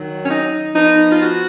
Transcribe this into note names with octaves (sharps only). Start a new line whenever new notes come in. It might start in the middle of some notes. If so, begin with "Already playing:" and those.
Already playing: D#3 F#3
C#4
D#4
F3 B3 D#4
F4
F#4